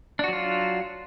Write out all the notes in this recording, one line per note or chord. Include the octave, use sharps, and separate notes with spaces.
F#3 D4 F4 F#4